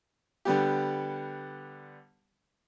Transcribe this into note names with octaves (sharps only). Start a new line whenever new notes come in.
D3 G3 B3 G4